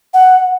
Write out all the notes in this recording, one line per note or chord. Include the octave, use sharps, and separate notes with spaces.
F#5